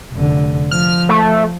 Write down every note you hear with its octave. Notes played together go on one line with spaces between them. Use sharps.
F1 D3
F3 F6
A3